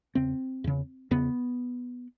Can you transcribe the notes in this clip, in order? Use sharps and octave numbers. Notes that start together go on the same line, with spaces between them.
E2 C#3 C4
E2 C#3
E2 C#3 B3